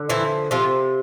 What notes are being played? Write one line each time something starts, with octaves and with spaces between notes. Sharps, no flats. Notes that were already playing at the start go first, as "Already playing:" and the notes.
Already playing: D3
E3 F3 E4
C3 F3 F4